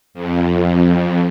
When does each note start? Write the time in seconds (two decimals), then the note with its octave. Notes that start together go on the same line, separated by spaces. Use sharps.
0.14 F2